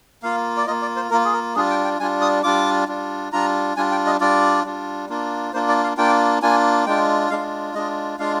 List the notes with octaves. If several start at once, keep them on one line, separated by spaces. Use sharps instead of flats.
A#3 F4 F5
D5
A#3 F4 D#5
D5
C5
A#3 F4 A#4
G#4
A#4
G3 D4 F4 G#4
G5
G5
G3 D4 F4 G#5
D#6
G3 D4 F4 D6
G3 D4 F4
G3 D4 F4 A#5
G3 D4 F4 G#5
G5
D#5
G3 D4 F4 D5
G3 D4 F4
A#3 D4 F4
A#3 D4 F4 C5
D5
F5
A#3 D4 F4 G5
A#3 D4 F4 G#5
G#3 D4 F4 G5
G#3 D4 F4 F5
G#3 D4 F4 D#5
G#3 D4 F4 F5